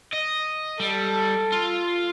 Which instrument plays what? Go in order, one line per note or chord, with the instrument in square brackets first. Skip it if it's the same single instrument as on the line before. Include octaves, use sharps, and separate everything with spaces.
[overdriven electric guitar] D#5
[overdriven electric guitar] G3 [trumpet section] A4
[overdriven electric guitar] F4